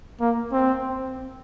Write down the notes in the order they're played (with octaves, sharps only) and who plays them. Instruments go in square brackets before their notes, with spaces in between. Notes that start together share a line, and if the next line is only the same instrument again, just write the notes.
[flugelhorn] A#3
C4